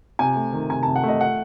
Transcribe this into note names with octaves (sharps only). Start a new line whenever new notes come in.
C3 G#5
A3
D#3
C3 G#5
C3 A5
F#5
A3 D#5
F#5